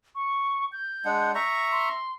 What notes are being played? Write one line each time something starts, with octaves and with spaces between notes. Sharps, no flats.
C#6
G6
G#3 D4 F#5
E5 A#5 C#6
C6